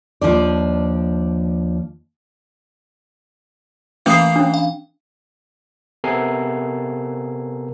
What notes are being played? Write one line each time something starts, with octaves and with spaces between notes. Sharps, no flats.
D#2 F3 D4 D5
E3 A3 A#3 C#4 D#6 C7
C#4 D4
F5
C3 B3 A4 A#4 G#5 C7